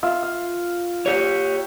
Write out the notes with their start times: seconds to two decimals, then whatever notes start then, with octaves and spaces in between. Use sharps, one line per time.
0.03 F4 E5 F5
0.23 F5
1.06 G4 C#5